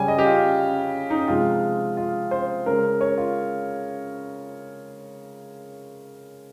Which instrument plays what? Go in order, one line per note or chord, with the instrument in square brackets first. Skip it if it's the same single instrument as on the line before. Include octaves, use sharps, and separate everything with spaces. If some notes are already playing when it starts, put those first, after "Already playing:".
Already playing: [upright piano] C#3 G3 G#5
D#5
G4
F4
D#4
C3 F3 G#3 F4
F4
C5
C#3 G#3 A#4
C#5
F4